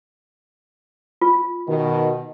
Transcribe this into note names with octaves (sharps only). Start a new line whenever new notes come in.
F4
B2 D#3